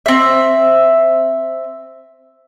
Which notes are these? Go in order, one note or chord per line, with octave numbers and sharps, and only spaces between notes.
C4 E5